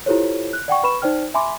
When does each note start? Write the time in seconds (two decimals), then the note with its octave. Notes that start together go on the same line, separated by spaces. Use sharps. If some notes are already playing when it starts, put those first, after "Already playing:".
0.06 E4 F4 G4 A4 C5 C#5
0.53 F#6
0.68 D5 F#5 G5 C#6
0.84 B4 B5 C#6 E7
1.02 D#4 C5 D5 G5 F6
1.34 E5 G#5 B5 C6 D6